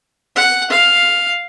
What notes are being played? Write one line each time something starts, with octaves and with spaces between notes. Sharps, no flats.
F#5
F5